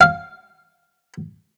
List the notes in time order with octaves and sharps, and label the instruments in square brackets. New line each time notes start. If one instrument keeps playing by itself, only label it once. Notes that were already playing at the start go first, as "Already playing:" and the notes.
[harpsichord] F5